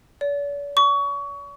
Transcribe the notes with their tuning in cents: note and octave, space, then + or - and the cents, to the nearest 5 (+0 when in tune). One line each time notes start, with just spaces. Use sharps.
D5 -45
C#6 +25